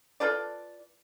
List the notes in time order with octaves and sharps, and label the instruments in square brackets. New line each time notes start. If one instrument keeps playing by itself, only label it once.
[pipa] F4 A4 B4 D5